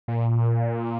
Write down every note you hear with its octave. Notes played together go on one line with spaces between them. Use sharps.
A#2